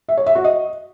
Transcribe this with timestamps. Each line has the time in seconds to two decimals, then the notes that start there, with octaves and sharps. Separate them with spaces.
0.09 E5
0.17 C#5
0.26 E5
0.35 F#4
0.44 D#5